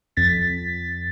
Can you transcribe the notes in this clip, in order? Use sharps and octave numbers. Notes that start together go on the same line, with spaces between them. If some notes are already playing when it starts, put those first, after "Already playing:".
F2 A6 B6